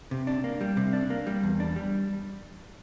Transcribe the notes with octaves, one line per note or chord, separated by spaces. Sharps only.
C3
D4
A#3
G3
C3
D4
A#3
G3
E2
D4
G3